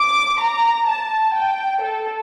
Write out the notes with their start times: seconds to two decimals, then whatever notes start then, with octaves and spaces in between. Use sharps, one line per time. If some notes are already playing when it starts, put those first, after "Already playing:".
Already playing: D6
0.41 A#5
0.87 A5
1.34 G5
1.81 A4